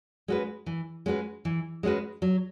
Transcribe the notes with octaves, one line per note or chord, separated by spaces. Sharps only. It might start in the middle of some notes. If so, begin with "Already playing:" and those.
G#3 C#4 F#4 B4
E3
G#3 C#4 F#4 B4
E3
G#3 C#4 F#4 B4
F#3